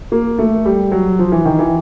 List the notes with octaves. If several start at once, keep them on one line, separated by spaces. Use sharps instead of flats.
A#3
A3
G3
F#3
F3
E3
D#3
E3